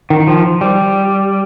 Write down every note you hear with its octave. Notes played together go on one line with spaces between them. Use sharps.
D#3
F3
G3